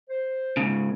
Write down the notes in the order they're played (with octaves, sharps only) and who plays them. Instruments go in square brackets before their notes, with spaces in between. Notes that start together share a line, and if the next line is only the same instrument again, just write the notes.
[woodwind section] C5
[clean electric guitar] G#2 C#3